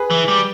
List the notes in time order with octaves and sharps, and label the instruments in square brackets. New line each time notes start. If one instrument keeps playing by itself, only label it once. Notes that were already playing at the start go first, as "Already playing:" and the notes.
Already playing: [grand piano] G#4 B4
[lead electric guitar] E3
G3